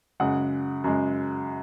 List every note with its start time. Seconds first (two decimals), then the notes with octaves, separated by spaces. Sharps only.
0.20 F#2 C#3 G#3 F#5
0.84 F#2 C#3 G#3